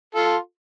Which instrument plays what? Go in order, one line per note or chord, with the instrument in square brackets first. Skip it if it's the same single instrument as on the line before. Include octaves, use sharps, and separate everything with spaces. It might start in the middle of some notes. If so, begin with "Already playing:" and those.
[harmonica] F4 A4